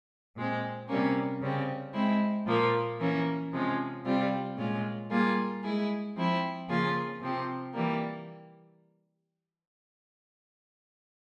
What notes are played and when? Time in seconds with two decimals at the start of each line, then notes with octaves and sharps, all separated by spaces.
0.36 A#2 G#3 C4
0.89 C3 G3 A#3 C#4
1.42 C#3 G3 C4
1.94 G#3 C4 E4
2.47 A#2 F3 A#3 F4
3.00 E3 A#3 C#4
3.52 C3 F3 G#3 C#4
4.04 C3 G3 C4 F4
4.58 A#2 G#3 C#4 F4
5.10 G3 A#3 F4 G#4
5.63 G#3 E4 G#4
6.16 F3 C4 E4
6.68 C#3 F3 A#3 F4 G#4
7.21 C3 F3 C4 G4
7.74 E3 G3 A#3